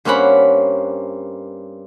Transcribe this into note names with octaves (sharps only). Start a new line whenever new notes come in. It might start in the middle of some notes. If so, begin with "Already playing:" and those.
G2 A#3 C4 C#4 F#5 B5